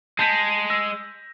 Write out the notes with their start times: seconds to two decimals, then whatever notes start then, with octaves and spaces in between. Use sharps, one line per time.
0.19 G#3 A5 G6 B6
0.70 E6 A#6